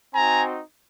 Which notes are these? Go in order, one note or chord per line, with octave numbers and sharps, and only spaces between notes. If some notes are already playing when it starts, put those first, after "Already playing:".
C4 D#4 F#4 G#5 A#5